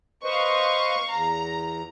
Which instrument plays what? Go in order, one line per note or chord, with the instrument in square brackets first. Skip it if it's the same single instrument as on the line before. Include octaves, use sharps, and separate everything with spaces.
[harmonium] B4 C5 D#5 [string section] F5 C#6
[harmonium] E2 [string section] A#5